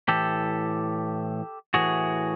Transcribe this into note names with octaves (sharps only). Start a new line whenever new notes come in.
A2 E3 G4 A4
A2 E3 F#4 G#4